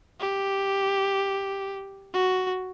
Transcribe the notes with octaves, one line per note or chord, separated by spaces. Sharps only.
G4
F#4